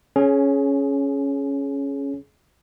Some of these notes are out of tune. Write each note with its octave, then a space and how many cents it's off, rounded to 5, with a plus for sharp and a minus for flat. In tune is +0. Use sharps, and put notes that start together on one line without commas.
C#4 +0 G#4 +25